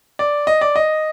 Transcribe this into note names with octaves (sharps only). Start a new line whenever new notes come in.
D5
D#5
D5
D#5